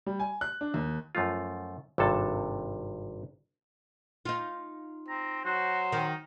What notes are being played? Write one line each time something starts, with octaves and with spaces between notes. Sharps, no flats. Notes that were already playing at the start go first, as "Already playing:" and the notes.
G3
G#5
F#6
D4
D#2
F#2 F3 A3 F4
G#1 G2 C3 A4 A5
D#4 F4
C4 A#5
F#3 F#4 C5
D#3 D#4